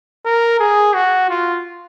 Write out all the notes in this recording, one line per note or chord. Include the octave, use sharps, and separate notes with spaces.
A#4
G#4
F#4
F4